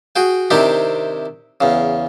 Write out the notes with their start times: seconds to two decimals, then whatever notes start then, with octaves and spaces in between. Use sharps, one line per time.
0.16 F#4 G#4 G5
0.51 C3 D#3 C4 D4 E4 G4
1.61 E2 C#3